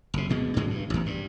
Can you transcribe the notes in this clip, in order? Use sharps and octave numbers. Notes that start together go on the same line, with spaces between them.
F#1 C3
D2 B2 G#3
G#2 D3 F#3 G#3
G2
A1 E2
G2